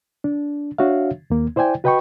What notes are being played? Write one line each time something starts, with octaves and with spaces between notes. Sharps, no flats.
D4
D4 F#4 C#5 E5 F5
D#2 A#3
E4 C5 D5 G5 G#5
F#4 B4 D#5 G5 B5 C#6